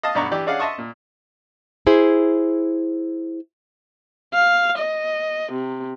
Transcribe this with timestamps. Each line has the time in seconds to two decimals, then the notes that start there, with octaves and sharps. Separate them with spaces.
0.03 D#5 F5 A5 D#6
0.15 B1 G2 B3 D5 A#5 C#6
0.31 E3 D4 G4 D5
0.46 C#4 D4 G#4 D5 F5 F#5
0.59 D#5 E5 A5 C6 C#6 D#6
0.78 A#2
1.86 E4 G#4 C5
4.34 F5
4.78 D#5
5.53 C3